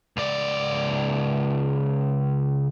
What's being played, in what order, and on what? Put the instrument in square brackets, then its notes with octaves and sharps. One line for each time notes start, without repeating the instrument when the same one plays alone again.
[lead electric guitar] C#2 D5